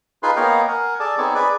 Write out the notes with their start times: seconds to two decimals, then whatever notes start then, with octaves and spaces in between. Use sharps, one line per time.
0.23 D#4 F4 G#4 B4 C6
0.36 A#3 B3 C#5 D#5 F5 G5
0.68 A#4 F#5 G#5
1.00 G#4 A4 D5 A5
1.18 B3 C4 D#4 G#4 A4 C#5
1.34 G#4 B4 D5